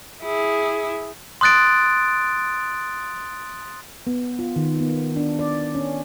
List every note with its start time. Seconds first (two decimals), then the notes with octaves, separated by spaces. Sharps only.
0.23 E4 G#4
1.41 C6 D#6 F#6 A6 D7
4.07 B3
4.39 F4
4.56 D#3
4.80 B3
5.16 D4
5.39 D5
5.75 C#4